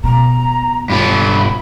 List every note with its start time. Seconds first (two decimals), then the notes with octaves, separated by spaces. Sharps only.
0.04 B2 A#5
0.90 G2 F4 B5